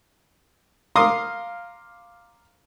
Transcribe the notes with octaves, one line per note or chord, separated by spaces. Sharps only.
F5 A#5 C6 D6 D#6